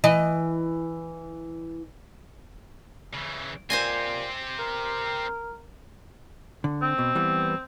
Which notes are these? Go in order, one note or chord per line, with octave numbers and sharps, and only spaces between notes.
E3 D#5
C#3 E3
A#2 C4 G4 C5 D#5 G#5
A#4
D3
C4
B2
E3 G3 B3